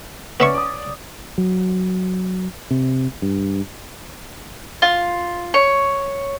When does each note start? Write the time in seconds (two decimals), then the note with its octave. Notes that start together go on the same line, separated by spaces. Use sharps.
0.40 B3 C#4 C#5 D5 E5 C#6
0.54 D5 D#6
1.38 F#3
2.71 C3
3.22 G2
4.82 F4
5.54 C#5